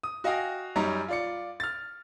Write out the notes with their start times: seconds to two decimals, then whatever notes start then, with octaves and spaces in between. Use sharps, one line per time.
0.03 D#6
0.24 F#4 D#5 F5 G5 G#5
0.76 F#2 G3 D#4 C#5 A#5
1.08 F4 D5 C#7
1.60 F6 A6